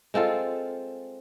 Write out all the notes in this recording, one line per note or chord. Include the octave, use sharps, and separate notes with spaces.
G#3 C4 F4 A4